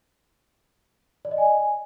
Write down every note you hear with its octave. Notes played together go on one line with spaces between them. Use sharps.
D5
D#5
G#5